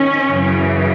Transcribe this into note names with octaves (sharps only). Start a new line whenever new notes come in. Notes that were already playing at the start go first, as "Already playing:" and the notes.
Already playing: D#3 C#4
F#2 C#3 E3